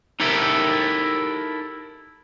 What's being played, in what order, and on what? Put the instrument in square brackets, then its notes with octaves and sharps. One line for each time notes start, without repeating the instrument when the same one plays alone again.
[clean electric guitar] D#4 E4 G4 A4 A#4 E5